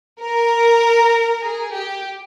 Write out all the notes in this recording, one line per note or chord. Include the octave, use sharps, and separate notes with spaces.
A#4
G#4
G4